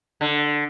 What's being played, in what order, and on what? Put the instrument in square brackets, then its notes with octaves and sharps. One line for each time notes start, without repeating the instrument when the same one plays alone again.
[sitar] D3